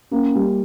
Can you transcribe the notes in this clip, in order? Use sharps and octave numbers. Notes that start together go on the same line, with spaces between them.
A#3 C#4
G3